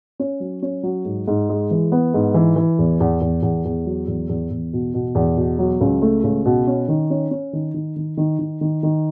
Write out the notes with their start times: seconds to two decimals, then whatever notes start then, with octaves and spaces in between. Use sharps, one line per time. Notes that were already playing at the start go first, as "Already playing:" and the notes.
0.20 C#4
0.40 F#3
0.62 C#4
0.83 F#3
1.05 G#2
1.28 G#2
1.49 G#3
1.71 E3
1.92 B3
2.14 G#2
2.34 E3
2.56 E3
2.79 E2
3.00 E2
3.21 E2
3.42 E2
3.65 E2
3.86 F#3
4.07 E2
4.29 E2
4.51 E2
4.73 B2
4.94 B2
5.15 E2
5.37 B2
5.59 F#3
5.81 C#2
6.02 A3
6.24 C#2
6.45 B2
6.67 C#4
6.88 D#3
7.10 C#4
7.31 C#4
7.53 D#3
7.74 D#3
7.96 D#3
8.17 D#3
8.39 D#3
8.61 D#3
8.83 D#3